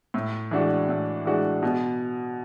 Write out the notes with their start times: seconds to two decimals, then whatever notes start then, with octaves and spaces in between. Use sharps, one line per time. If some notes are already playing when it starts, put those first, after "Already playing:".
0.14 A2
0.51 E3 G#3 D4 F#4
0.88 A2
1.25 E3 G#3 D4 F#4
1.63 B2